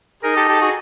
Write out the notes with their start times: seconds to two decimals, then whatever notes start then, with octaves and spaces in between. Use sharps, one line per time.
0.23 D#4 G#4 A#4 D#5
0.36 G4 A4
0.48 G4 A4
0.61 F#4 G#4